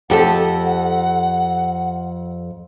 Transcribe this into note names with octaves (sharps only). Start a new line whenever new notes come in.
F2 G4 A4 F#5